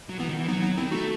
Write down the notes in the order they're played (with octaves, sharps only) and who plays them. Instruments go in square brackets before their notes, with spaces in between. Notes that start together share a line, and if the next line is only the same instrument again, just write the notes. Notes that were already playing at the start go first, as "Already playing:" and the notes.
[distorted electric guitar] F#3
[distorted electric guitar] E3 [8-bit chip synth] B3
[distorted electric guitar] D#3
E3
[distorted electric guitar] F#3 [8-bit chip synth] B3 D#4
[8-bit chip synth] B3 D#4
[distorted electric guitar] D#3 [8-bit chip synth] C4 E4
[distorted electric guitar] A3 [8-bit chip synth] D#4 F#4